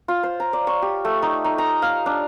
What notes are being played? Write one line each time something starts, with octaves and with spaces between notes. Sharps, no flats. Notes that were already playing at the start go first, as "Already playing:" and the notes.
F4
C5
A#5
D5
C#6
G4
A3
D#4
D#4
A#5
F5
D4